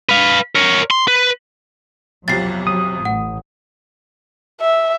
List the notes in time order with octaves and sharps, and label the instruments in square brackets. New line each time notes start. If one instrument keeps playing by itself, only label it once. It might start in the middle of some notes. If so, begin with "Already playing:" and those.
[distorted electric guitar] B4 F5
A#4 C#5
C6
B4
[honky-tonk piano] B1 F2 C3 [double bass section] F#3 [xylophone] A6 C7
[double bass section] F#3 [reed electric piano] D#6
[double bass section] A1 [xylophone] F#5
[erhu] E5